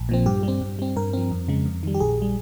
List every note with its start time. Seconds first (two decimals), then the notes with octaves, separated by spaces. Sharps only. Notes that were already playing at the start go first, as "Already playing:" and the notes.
Already playing: A#1
0.09 A#2 F3 C4
0.26 G2 G4
0.43 G3 C4
0.61 G2
0.79 G3 C4
0.96 G2 A#4
1.13 F3 C4
1.31 F2
1.48 C#3 G#3
1.66 F2
1.83 D#3 G3
1.94 G4
2.00 A#1 G#4
2.22 G3